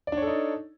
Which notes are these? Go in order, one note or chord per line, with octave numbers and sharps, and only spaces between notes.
D4 D#4 A4 C#5 D5